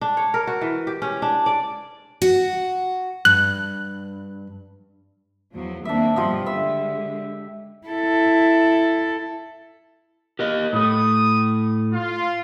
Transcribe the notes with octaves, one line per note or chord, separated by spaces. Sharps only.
D4
C#5
A#4
F#4
E3
G4
C#4
D4
D5
F#4
G2 F#6
E2 F3 F#3
D#2 A#3 C4 D4 E5
G2 B2 F3 F4 G4 D#5
D3 G#3 E5 E6
E4 A4
G4 A#4 D#5
A2 A3 D#6
F4